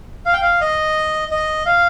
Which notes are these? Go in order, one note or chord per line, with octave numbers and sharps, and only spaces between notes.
F5
G5
F5
D#5
D#5
F5